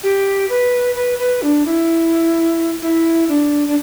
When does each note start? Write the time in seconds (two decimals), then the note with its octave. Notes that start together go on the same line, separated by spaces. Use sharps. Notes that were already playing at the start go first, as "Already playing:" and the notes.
0.03 G4
0.50 B4
0.95 B4
1.19 B4
1.42 D4
1.66 E4
2.82 E4
3.29 D4
3.67 D4